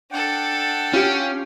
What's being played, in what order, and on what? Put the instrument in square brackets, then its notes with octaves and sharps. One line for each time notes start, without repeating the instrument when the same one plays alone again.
[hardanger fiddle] D4 A4 [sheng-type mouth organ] F#5 G5
[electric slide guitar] C#4 [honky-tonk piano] F4 G4 D7